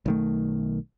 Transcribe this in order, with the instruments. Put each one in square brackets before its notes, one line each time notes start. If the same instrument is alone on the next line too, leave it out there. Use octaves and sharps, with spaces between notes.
[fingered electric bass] B1 D#3 A3